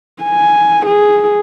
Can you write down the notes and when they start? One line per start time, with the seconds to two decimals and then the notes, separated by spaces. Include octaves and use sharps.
0.23 G#5
0.86 G#4